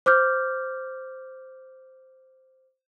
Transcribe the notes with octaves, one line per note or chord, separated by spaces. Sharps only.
C5 D6 F6 G6